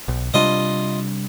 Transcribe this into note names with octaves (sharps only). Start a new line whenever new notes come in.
B1
C3 G3 D4 F4 D#5